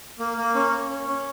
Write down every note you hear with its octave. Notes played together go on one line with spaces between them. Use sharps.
A#3
A#3
C#4
C#4
C#4
C#4